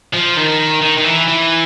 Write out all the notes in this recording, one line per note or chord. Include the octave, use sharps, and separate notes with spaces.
F3
D#3
D#3
D#3
E3
E3